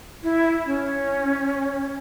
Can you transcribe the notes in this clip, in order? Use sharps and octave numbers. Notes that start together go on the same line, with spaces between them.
E4
C#4